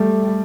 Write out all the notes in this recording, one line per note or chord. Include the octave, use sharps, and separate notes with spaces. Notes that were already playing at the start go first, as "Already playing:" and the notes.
Already playing: G3 A3 A4